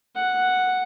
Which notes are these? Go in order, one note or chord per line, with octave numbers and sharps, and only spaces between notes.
F#5